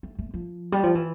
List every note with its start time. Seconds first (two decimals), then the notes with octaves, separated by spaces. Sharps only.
0.03 A3
0.19 A3
0.34 F3
0.72 G3
0.83 F3
0.95 E3